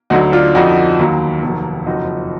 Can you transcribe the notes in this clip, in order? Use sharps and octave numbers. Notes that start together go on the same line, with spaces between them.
D2 D3 F#3 D#4 F#4
D4 F4
F2 D3 F3 D#4 F#4
D#2 D#3 F#3
F1 D#2 D#3 F#3
F#1 F2 F3 D#4 F#4